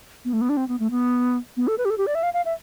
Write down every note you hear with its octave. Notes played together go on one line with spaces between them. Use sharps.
B3
A3
B3
D4
C4
B3
A3
B3
B3
A4
B4
G4
A4
G4
D5
E5
F5
F5
E5